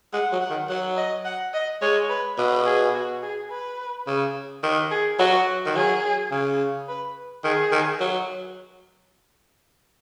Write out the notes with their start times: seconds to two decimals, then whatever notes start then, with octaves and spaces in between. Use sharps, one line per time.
0.13 G#3 F#5
0.32 F#3
0.41 F#5
0.51 D#3
0.69 F#3 F#5
0.97 D#5
1.25 F#5
1.54 D#5
1.82 G#3 C#5
2.09 B4
2.38 B2 B4
2.66 G#4
2.94 F#4
3.22 G#4
3.51 B4
4.07 C#3
4.63 D#3
4.91 G#4
5.19 F#3 F#4
5.66 D#3
5.76 F#3 G#4
6.31 C#3
6.88 B4
7.44 D#3 G#4
7.72 D#3
8.00 F#3